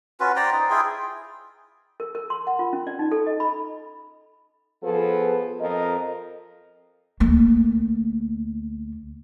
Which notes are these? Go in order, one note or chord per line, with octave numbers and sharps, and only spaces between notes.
C#4 F4 F#4 B4
C5 D5 G5 A#5
D#4
E4 F4 G#4 G5
A#4
A#4
C6
F#5
F4
C#4
D5
D#4
A4
D#5
B5
F3 B3 G#4 A4 B4
F2 A#4 D#5
D2 A#3